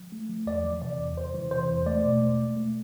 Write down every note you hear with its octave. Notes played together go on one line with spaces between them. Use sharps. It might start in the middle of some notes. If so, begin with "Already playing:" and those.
Already playing: F3
A3
F3
E2 D5
E3
C3 D5
E2
C3 C5
E3
C3 C5
E2
A3 D5
B2
A3
A3
A3